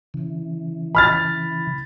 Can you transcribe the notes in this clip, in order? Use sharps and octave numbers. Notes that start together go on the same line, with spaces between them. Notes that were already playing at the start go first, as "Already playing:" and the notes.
C#3 E3
B5 F6 A6